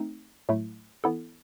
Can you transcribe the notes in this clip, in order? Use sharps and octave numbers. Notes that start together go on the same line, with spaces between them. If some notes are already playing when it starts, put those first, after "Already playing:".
Already playing: A3 C4 D#4
A2 F#3 A3 E4
E3 B3 E4 A4